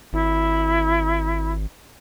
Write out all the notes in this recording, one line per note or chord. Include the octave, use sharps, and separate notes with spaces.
G#1 E4